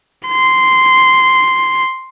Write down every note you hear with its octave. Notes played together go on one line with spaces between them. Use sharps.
C6